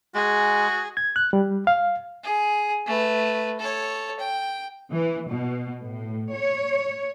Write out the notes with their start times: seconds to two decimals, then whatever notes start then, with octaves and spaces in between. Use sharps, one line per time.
0.15 G#3 F#4 G#4
0.97 G#6
1.16 F#6
1.33 G3
1.67 F5
2.24 G#4
2.86 A3 B4
3.60 A4 C#5
4.19 G5
4.91 E3
5.28 B2
5.81 A2
6.33 C#5